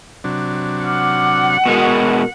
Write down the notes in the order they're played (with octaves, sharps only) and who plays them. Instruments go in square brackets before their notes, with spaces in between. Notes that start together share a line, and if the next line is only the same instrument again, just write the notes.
[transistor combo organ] C3 F#3 D4
[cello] F#5 [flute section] D6 F6
[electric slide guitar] B2 G#3 [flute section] F#4 A#4 B4